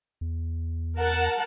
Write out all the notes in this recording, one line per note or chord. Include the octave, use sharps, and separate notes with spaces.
E2
A#4 F#5 A5